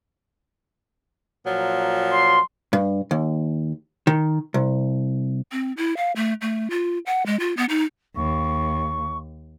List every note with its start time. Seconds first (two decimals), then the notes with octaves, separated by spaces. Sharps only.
1.46 A#2 F3 F#3
2.10 C6
2.73 G2
3.11 D#2
4.07 D#3
4.54 C2
5.52 C4
5.77 E4
5.97 F5
6.16 A3
6.41 A3
6.70 F4
7.06 F#5
7.26 G#3
7.40 F4
7.57 B3
7.69 D#4
8.16 D#2 C#6